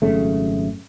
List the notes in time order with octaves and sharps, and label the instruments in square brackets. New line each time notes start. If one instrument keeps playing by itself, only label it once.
[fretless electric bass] G#1 F#2 C#3 A3